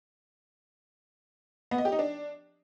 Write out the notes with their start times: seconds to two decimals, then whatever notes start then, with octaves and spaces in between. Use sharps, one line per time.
1.71 B3
1.78 D#5
1.85 G4
1.92 D#4
1.99 D4